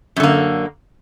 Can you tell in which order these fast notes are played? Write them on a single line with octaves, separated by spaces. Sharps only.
F#2 D3 A#3